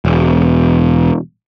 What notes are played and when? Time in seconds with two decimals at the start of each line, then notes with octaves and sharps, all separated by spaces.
0.05 E1